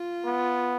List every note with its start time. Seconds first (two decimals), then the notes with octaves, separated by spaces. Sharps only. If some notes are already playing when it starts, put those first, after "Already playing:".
Already playing: F4
0.25 B3